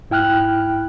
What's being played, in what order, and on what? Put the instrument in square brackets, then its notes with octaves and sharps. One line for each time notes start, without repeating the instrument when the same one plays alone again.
[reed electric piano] G#2 E4 G5 F6 F#6